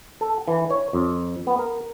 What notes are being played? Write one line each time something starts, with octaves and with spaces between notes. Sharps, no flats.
A4
E3
C#5
F2
B3
A#4